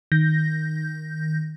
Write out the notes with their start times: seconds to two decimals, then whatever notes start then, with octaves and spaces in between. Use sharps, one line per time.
0.12 D#3 G6 A#6